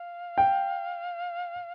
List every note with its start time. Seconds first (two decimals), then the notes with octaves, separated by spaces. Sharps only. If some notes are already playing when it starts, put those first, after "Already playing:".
Already playing: F5
0.38 G5